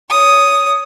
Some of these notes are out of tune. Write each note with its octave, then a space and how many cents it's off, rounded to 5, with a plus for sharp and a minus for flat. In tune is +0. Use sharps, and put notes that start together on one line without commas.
C#5 +20 D#6 +0